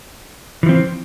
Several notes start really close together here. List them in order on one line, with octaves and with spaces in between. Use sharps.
E3 F3 C4